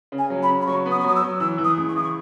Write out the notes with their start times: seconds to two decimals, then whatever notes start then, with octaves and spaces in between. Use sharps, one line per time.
0.12 C#3
0.18 G#5
0.30 F#3
0.43 B5
0.48 C#3
0.62 B5
0.67 F#3 C#6
0.86 B3
0.91 D#6
1.00 C#6
1.04 F#3 D#6
1.16 E6
1.23 F#3
1.40 E3 E6
1.58 E3
1.65 D#6
1.77 C#2
1.89 C#6
1.96 E3 D#6
2.03 C#6